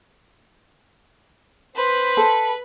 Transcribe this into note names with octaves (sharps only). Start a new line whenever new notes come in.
B4 C5
A4